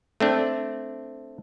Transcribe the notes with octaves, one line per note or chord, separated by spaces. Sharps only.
A3 C4 D4